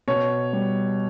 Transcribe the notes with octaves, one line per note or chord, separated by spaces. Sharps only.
B2 C#5
G3